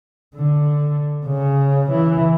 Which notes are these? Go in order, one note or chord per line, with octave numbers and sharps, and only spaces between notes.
D3
C#3
E3